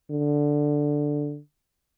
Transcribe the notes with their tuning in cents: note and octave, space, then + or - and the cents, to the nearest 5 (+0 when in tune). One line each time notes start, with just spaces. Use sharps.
D3 +0